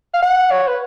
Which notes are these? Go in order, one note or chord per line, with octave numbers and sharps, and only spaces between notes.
F5
F#5
C#5
B4